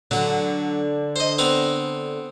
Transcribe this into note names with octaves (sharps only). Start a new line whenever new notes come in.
D3 F#3 F#4
C5 D#5
B3 C4 A#5